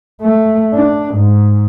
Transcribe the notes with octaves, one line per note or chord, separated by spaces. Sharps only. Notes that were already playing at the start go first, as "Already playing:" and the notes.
A3
D4
G#2